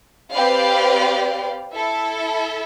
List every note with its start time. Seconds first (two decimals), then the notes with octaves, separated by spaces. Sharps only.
0.32 C4 G4 B4 D5 F5
1.73 E4 A4 E5